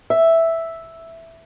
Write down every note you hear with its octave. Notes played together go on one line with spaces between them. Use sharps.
E5